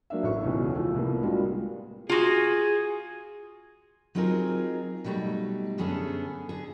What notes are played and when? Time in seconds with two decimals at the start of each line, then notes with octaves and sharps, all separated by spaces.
0.10 F#3 A#3 D4 E5
0.23 A1 A2 A4 C#6
0.44 E1 C#2 B2 E3 C#4 F#4
0.75 E3 F3 A3
0.94 C2 A2 A#3 B3
1.23 G3 G#3 A#3 D4 F4 F#4
2.09 F4 F#4 G#4
4.15 F#3 C4 D#4 F4 G#4 A#4
5.04 B2 F#3 G3 A3 D#4
5.78 F#2 D3 B3 C#4 G#4 A4
6.49 D3 G#4